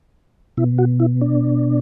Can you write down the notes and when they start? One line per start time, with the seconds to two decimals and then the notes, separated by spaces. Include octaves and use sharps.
0.57 B2 E4
0.78 F#4
1.00 E4
1.22 D4